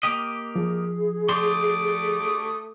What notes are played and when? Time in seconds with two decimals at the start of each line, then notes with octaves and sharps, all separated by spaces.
0.03 A#3 G4 D#5
0.55 F3 G#4
1.29 A3 G4 D5 C6 D6 D#6